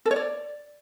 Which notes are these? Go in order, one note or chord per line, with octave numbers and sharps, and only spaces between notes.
A4
C#5
D5